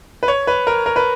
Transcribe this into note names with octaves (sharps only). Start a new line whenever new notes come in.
B4
C#5
B4
A#4
A#4
B4